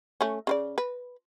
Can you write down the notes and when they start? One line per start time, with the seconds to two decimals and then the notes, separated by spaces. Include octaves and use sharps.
0.21 A3 C#4
0.47 C#3 F4 D5
0.78 B4